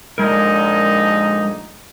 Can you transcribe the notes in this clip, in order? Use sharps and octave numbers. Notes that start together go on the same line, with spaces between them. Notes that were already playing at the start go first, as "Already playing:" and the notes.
A#1 D3 G#3 D#4 A#4